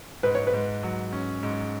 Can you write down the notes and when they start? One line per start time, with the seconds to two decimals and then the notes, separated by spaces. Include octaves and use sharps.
0.23 G#2 B4
0.35 C#5
0.47 B4
0.53 G#2
0.83 F#3
1.13 C#4
1.43 G#2